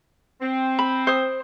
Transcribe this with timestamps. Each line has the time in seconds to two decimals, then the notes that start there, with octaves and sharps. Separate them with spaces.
0.41 C4
0.79 B5
1.07 C5 D#6